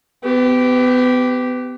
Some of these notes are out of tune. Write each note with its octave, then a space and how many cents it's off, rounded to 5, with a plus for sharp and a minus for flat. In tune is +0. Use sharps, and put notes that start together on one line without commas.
B3 +30 G4 -10